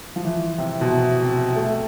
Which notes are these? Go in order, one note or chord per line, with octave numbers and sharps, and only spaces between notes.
F3
E3
C3
B2
C3
C3
A3